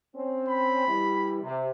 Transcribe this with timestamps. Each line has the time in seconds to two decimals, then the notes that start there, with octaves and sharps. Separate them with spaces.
0.16 C4 C#4
0.49 B5
0.87 E3 G3
1.42 C3